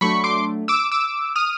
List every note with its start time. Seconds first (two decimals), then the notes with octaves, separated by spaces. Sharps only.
0.01 F#3 A3 D4 B5 C#6
0.24 C6 D6
0.68 D6 E6
0.92 D6 E6
1.35 D#6 F6